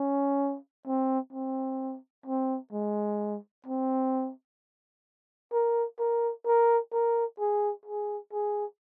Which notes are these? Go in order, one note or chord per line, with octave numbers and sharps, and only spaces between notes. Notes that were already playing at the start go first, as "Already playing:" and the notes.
Already playing: C#4
C4
C4
C4
G#3
C4
A#4
A#4
A#4
A#4
G#4
G#4
G#4